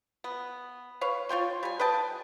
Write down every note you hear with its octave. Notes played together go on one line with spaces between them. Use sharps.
B3
B4 C#5 F5
F4 C#5 G5 C6
G3 G#5
B4 D#5 G5 A5